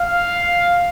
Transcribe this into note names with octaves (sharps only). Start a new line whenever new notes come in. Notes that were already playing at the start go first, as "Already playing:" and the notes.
Already playing: F5